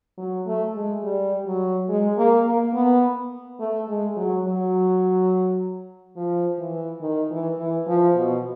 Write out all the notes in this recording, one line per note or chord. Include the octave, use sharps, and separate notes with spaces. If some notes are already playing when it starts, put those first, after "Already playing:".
F#3
A3
G#3
G3
F#3
G#3
A#3
A#3
B3
A3
G#3
F#3
F#3
F3
E3
D#3
E3
E3
F3
B2